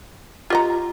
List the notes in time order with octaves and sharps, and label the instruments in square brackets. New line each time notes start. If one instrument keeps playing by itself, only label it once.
[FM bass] F4 [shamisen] G4 D#5 A#5